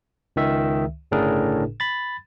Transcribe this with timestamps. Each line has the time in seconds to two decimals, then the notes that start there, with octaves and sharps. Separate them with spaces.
0.36 C#2 D#3 E5
1.11 G1 A2 C#3 D4 G#4 A#4
1.80 B5 A6